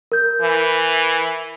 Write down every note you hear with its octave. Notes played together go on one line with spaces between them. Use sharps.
A#4 G6
E3